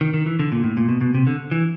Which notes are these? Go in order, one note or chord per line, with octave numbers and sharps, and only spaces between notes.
D#3
D#3
E3
D3
A#2
A2
A#2
B2
B2
C3
D3
E3